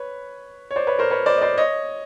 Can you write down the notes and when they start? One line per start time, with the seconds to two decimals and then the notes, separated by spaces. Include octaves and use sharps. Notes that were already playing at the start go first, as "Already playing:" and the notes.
Already playing: B4 C#5
0.71 C#5
0.76 C5 D5
0.87 B4 C#5
0.99 A#4 C5
1.10 B4 C#5
1.26 C5 D5
1.37 D#5
1.42 C5 D5
1.57 C#5 D#5